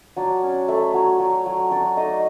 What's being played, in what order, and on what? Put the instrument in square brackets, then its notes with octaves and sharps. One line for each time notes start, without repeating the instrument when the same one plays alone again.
[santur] F#3 D4 D5
C#4
A3
F#3
F#3
F#3
F#3 D4 D5
A3 D#4 D#5